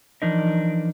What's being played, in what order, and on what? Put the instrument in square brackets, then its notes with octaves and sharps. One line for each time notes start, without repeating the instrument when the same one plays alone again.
[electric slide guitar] E3 F3 D4 D#4 A#4 D#5